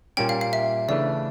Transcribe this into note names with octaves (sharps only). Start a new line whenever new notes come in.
A#2 G3 A#3 C#4 G5
F5
F5
E5
C#3 E3 A3 D4 D5